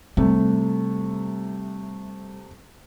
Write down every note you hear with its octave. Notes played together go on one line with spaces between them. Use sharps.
C3 G3 A3